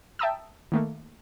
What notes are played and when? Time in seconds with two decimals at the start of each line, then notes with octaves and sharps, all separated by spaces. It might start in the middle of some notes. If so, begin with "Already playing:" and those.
0.19 E5 G5 A5 A#5 D#6 E6
0.72 D#3 A3 A#3